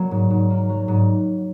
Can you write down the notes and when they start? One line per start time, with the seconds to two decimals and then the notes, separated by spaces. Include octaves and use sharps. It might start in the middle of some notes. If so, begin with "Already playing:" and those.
Already playing: F#3 A#3
0.11 G#2
0.30 G#2
0.50 A#3
0.69 F#3
0.88 G#2